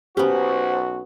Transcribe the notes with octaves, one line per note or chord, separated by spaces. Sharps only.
B1 B3 C#4 F#4 G4 C5